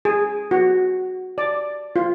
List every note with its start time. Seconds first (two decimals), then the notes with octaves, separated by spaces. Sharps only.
0.05 G#4
0.51 F#4
1.38 D5
1.96 F4